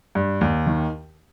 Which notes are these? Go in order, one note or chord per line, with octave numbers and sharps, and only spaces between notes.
G2
D#2
D#3